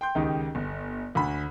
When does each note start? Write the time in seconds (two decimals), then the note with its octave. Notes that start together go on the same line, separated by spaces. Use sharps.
0.01 G5 C6 G6
0.15 C#2 D#3 D#4 G4
0.55 G1
1.15 D2 D3 B5